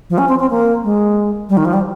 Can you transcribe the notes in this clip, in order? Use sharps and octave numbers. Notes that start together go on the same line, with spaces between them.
F3
C#4
C4
C4
A#3
G#3
G3
D#3
F3
G3